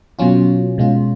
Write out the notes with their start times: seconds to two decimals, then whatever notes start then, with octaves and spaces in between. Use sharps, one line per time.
0.19 B2 F#3 C#4 F4
0.78 B2 G#3 C#4 F4